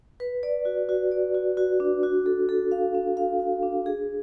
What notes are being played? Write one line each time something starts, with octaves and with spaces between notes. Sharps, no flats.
B4
D5
F#4
F#4
D5
F#4
F#4
D4
F#4
A4
A4
F5
D4
F5
F#4
D4
G#4